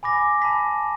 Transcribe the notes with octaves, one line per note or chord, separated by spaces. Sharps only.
G#5 B5 D6 A#6
A5 B5 B6